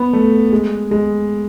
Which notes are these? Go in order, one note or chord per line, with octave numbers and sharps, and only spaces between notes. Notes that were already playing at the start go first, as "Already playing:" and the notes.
Already playing: B3
A3
G#3
G#3